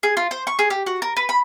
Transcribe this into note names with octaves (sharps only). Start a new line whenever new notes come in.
G#4
F4
C5
C#6
G#4
G4
F#4
A#4
B4
B5